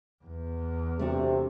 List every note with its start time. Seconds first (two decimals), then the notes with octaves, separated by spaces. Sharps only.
0.24 E2
0.99 C3 A3 D4 F#4